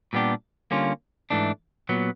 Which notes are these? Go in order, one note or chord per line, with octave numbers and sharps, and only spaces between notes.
A#2 G3 B3 D4 G4
D3 G3 A#3 C#4 F4
G#2 E3 A3 D4
A#2 F#3 B3